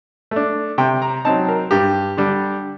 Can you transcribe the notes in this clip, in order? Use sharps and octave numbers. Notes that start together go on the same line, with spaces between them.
A3 D4
C3 G5
A#5
F#3 C4 D#4 A5
A#4
G2 G4
D3 G3 D4